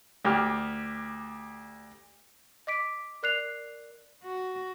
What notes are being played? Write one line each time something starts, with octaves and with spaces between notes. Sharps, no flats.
D2 G4 F6
D#5 D6 B6 D7
A#4 D5 F#6 C7 F7
F#4